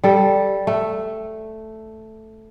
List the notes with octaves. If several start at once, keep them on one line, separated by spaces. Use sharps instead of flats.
G3 A4
A3